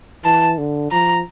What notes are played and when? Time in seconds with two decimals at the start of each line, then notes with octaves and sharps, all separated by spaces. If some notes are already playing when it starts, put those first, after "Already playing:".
0.24 E3 A5
0.58 D3
0.92 F3 A#5